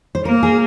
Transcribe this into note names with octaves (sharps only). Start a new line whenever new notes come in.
C5
A#3 A#4
G#4